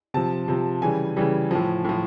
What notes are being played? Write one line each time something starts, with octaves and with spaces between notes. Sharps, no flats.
C3 F3 A5
C3 F3
C#3 E3 G3 G#5
C#3 E3 G3
A2 F3
A2 F3